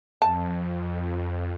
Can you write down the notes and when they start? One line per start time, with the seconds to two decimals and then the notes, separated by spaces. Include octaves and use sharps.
0.22 F2 A5